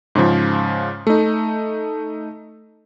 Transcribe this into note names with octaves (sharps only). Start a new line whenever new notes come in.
G#2 C#3 F3
A3 D#4